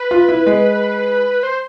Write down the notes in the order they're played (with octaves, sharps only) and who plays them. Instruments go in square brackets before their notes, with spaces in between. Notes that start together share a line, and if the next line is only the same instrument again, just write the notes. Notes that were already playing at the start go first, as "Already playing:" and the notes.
Already playing: [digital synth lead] B4
[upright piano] F4
E4
G#3
[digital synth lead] C5